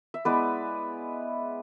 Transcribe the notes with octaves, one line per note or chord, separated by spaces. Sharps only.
E5
G#3 B3 E4 B4 D5